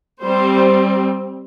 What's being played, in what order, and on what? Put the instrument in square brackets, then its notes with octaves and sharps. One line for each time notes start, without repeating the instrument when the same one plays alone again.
[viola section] G3 C4 C5